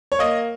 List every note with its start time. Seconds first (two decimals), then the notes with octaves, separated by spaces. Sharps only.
0.12 C#5
0.19 A#3 D#5